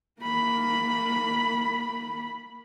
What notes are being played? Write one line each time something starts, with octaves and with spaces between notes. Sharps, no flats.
A#3 B5